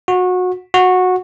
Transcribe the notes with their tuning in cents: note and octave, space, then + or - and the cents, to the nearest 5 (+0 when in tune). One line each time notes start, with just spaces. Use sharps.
F#4 -25
F#4 -15